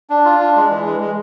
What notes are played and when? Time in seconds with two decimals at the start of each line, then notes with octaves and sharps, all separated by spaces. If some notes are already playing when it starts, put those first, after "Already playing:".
0.10 D4
0.25 F4
0.40 D4
0.56 G#3
0.70 E3
0.85 G#3
1.01 G#3